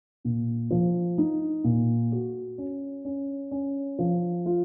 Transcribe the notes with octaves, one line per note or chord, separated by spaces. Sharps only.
A#2
F3
D#4
A#2
F#4
C#4
C#4
C#4
F3
F4